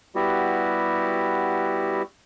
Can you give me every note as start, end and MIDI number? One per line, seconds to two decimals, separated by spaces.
0.15 2.02 55
0.15 2.02 59
0.15 2.02 64
0.15 2.02 66
0.15 2.02 67